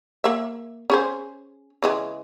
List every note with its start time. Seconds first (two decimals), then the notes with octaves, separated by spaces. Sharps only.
0.24 A#3 E5
0.90 C#4 G#4 C5
1.82 C#3 E3 G#3